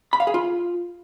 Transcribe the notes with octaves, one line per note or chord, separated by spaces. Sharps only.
B5
F5
G#4
F4